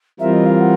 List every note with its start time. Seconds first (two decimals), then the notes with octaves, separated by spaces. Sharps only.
0.19 E3 G3 C4 F4 A#4 E5
0.33 D#5
0.45 F5
0.59 F#5